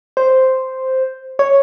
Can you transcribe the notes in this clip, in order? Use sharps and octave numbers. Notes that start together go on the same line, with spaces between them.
C5
C#5